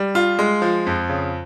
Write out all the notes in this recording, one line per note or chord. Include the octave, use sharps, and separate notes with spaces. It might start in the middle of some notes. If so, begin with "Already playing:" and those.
Already playing: G3
F4
G#3
F3
F2
C#3